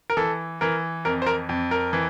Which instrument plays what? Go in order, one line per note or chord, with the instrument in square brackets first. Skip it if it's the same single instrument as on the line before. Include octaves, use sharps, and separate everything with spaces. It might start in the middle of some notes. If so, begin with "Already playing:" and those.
[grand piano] A#4
E3 A4
E3 A#4
F2 A#4
C5
A#4
F2
A#4
E3